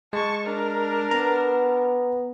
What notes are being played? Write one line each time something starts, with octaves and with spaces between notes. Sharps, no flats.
G#3 A5 C#6
D4 A#4
B3 A#5